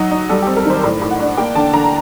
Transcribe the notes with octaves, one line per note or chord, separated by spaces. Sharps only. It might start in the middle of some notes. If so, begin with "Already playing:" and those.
Already playing: F#3 D#4
D#4
G3 A4
G4
C4
A#4
D#3 C5
A2 D5
A2
F#5
D4
A#3 G5
D3 A5
D3 A#5